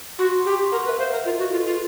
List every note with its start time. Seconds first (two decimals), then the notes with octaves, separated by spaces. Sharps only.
0.19 F#4 C6
0.33 C6
0.45 G4 C#6
0.58 C6
0.72 A#4 F#5
0.85 B4
0.89 E5
0.99 C5 F5
1.12 A#4
1.25 F4 D#5
1.38 F#4 B4
1.52 F4 A4
1.66 F4 G#4